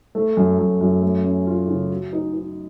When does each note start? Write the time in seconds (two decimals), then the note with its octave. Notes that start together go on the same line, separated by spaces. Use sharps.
0.15 A3
0.37 F#2
0.59 F#2
0.81 F#2
1.02 A3
1.24 C#4
1.47 F4
1.68 C#3
1.90 F#4
2.13 D#4
2.33 D#4